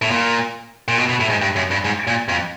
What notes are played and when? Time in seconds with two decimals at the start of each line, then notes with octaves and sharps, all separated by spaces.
0.02 A2
0.11 A#2
0.88 A#2
0.98 B2
1.09 B2
1.20 A2
1.30 G#2
1.42 G2
1.56 F#2
1.71 G2
1.85 G#2
2.07 A#2
2.29 F2